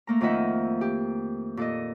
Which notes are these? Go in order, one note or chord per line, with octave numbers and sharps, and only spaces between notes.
A3 A#3 A#5
F2 D#3 F3 D#5 E5 F#5
G4
A#2 A4 D#5